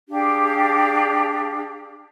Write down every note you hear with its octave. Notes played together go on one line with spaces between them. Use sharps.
D4 G4 G#4 F5